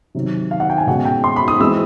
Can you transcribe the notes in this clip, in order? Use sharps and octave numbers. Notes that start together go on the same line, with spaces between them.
C3 D#3 F#3
F5
F#5
G5
G#5
B2 G#3 C#4 F#5
G5
C6
B5
D#6
E3 G#3 C4 E6